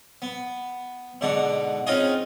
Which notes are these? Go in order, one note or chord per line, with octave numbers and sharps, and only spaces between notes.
B3
G#2 B2 D3 D4 F#5
C4 C#4 D#4 F4 G#4 D#5